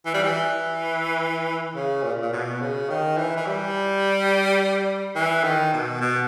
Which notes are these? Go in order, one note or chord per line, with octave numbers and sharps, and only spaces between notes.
E3
G3
E3
C#3
A#2
A#2
B2
C#3
D#3
E3
E3
G3
E3
D#3
B2
B2